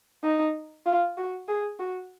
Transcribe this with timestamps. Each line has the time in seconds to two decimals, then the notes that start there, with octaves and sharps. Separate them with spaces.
0.24 D#4
0.86 F4
1.17 F#4
1.48 G#4
1.79 F#4